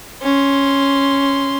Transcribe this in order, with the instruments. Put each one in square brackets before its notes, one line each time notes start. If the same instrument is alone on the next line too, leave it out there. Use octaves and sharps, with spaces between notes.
[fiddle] C#4 C6